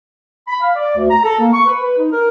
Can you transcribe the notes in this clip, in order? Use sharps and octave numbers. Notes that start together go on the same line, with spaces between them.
B5
F5
D5
D2
A#5
A4
A#3
C#6
B4
B4
D#4
A#4